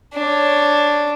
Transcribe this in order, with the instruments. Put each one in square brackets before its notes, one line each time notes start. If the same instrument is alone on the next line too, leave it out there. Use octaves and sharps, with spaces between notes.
[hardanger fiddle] D4 C#5